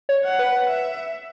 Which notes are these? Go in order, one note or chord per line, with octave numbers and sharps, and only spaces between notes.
C#5
F#5
B4
E5